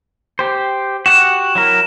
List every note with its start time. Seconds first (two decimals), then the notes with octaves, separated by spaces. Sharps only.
0.39 G4 C5
1.06 F#4 G4 F#5 E7
1.55 F#3 E4 A#4